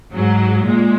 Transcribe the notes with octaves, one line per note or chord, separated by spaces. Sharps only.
G#2 F#3
A#2 G#3